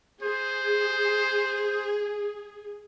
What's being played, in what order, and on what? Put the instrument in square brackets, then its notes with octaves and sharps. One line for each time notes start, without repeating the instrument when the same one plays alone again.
[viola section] G#4 [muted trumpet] C5